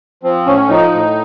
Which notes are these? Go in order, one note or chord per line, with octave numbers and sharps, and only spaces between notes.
F3 C4
A2 C#4
F3 D#4
A2